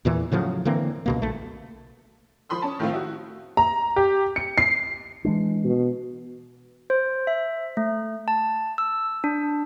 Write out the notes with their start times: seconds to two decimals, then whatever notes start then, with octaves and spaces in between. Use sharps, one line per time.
0.05 E2 A#2 E3
0.32 A2 C#3 F3 F#3
0.65 D3 E3 A#3 C4
1.06 C#2 B2 A#3
1.22 A#1 A3
2.49 F3 B5 C6 D#6
2.62 C#4 A5
2.79 A2 D#3 F3 A3 C4 F4
2.93 E4 F#4
3.57 A#5
3.96 G4
4.36 C#7
4.58 C7
5.25 E3 G#3 D4
5.64 B2
6.90 C5
7.27 E5
7.77 A3
8.28 A5
8.78 E6
9.24 D4